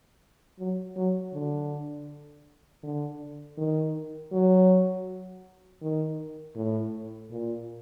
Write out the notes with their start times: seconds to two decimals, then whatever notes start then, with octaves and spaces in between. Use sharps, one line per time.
0.59 F#3
0.96 F#3
1.34 D3
2.83 D3
3.58 D#3
4.32 F#3
5.82 D#3
6.56 A2
7.31 A#2